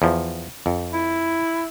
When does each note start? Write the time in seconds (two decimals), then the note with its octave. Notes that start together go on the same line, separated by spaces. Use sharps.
0.02 E2 F3
0.66 F2
0.93 E4